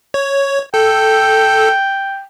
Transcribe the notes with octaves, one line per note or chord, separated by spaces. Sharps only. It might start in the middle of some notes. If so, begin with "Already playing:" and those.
C#5
A4 G5